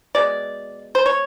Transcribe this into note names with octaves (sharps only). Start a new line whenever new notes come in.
B2 G#3 D5
C5
C#5